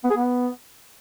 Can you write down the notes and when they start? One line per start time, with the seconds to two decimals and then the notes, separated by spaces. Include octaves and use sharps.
0.04 B3
0.10 G#4
0.16 B3